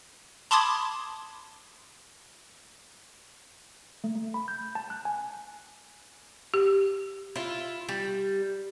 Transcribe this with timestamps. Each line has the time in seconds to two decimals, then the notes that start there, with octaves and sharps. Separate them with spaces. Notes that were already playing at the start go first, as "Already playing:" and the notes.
0.51 A5 B5 C6 D6 D#6 G#6
4.04 A3
4.15 A3
4.34 B5
4.48 G6
4.75 A5
4.90 F#6
5.05 G#5
6.54 G4
7.36 E4 F4
7.89 G3